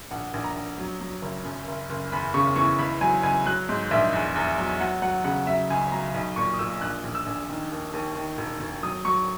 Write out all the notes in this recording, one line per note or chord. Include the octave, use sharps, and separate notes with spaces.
A#1 F#5
A#1
A#5
A#1
F#3
F#3
F#1
F#2
F#1
F#1
E2 B5
C#3 C#6
E3 C#6
C#2 B5
F#3 G#5
C#2 G#5
F#3 F#6
G#2
A#1 E5
E2
E2
F#3
F#3 F#5
F#3 F#5
C#3 F#5
F#3 E5
C#2 G#5
F#3 A#5
B1 B5
A#2 C#6
D#6
A#2 E6
A#1 F#6
A#1
E6
A#1
D#3
D#2
D#2
D#3
E1
E1
F#3 D#6
F#3 C#6